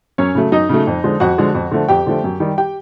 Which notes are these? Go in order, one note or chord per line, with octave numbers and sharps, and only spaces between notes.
F#2 C#4 C#5
C#3 F#3 A3
F#2 D#4 D#5
C#3 F#3 A3
F2
D3 F3 G#3
F2 F#4 F#5
D3 F3 G#3
F2
D3 F3 A3
F2 G4 G5
D3 F3 A3
F#2
D#3 G3
G4 G5